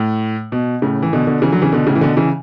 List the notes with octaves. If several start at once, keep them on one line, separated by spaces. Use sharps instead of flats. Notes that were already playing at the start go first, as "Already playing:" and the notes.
Already playing: A2
B2
A2 C#3
E3
B2 D3
B2 D3
C#3 E3
D3 F#3
C#3 E3
B2 D3
A2 C#3
E3
B2 D3
C#3 E3